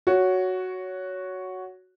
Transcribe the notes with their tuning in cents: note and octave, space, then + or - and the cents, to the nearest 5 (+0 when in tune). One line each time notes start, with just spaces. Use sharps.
F#4 +0 C#5 +10